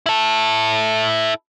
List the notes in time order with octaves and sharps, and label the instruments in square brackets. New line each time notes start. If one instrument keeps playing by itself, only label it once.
[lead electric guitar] E4 A4